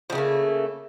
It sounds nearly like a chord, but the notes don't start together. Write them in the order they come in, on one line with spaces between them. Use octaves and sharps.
F3 C#3 A3 A#3